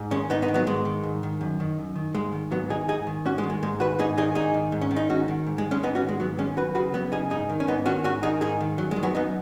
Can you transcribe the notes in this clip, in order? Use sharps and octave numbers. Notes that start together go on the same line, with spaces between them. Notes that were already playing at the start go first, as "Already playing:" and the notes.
Already playing: G#2
D#3 G#3 C#4
G#2 B3 D#4
B3 D#4
D#3
F#3 B3
G#2 G#3
D#3
G#2
D#3
F#2
D#3
F#2
D#3
G#2 G#3
D#3
G#2 F#3 B3
D#3 D#4 G#4
G#2 D#4 G#4
D#3
G#2 C#4 F#4
G#3
D#3
G#3
G#2 G#3
D#3 F#4 B4
G#2 D#4 G#4
D#3 D#4 G#4
G#2 D#4 G#4
D#3
G#2
C#4
D#3
D#4
G#2 C#4 F#4
D#3
G#2
G#3
D#3
G#3 C#4
G#2 B3 D#4
C#4 F#4
D#3
G#3
G#2 F#3 B3
D#3 G#3 C#4
F#2 F#4 B4
C#3 F#4 B4
F#2 F#3 B3
C#3 D#4 G#4
G#2 D#4 G#4
D#3
C#4
G#2 B3 D#4
D#3 C#4 F#4
G#2 C#4 F#4
D#3 D#4 G#4
G#2 D#4 G#4
D#3
F#2 F#3
G#3
D#3
F#3 B3
F#2 B3 D#4